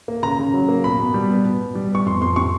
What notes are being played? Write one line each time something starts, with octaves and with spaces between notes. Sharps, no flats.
A#3
C#3 A#5
C#3
F#3
A#3
B2 B5
B2
G3
B3
B2
B2
G3
B3 C#6
F2 C6
F2 C6
C3 C#6